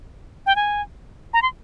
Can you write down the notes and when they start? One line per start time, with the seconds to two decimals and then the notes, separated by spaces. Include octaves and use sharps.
0.46 G5
0.56 G#5
1.34 A#5
1.42 C6